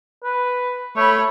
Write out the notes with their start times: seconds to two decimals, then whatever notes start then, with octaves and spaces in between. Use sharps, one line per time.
0.24 B4
0.96 A3 C#5 B5